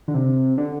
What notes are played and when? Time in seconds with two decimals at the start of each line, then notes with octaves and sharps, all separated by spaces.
0.08 D3
0.14 C3
0.58 D3